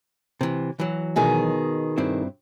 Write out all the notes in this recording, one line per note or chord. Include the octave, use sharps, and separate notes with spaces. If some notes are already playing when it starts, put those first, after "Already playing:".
C3 E3
E3 F#3
B2 D#3 G#4
G2 C4 E4